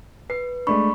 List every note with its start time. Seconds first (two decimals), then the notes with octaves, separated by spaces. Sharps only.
0.30 B4 C7
0.67 G#3 A3 D4 B5 C#6